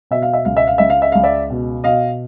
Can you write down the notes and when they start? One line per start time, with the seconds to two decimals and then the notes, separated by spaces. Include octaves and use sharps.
0.11 B2 E5
0.22 F5
0.33 E5
0.45 C#2 F5
0.57 E5
0.67 F5
0.78 C#2 E5
0.90 F5
1.02 E5
1.12 C#2 F5
1.23 D5 E5
1.50 B2
1.84 B2 D#5 F5